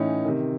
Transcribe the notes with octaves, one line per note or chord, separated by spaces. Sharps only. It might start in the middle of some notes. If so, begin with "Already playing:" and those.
Already playing: A2 E3 C#4 D#4
C3 D#3